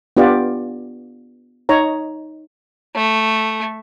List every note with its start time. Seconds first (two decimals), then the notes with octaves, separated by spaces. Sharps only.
0.17 B3 D4 F4 G4 D5
1.69 D#4 C#5 A#5
2.95 A3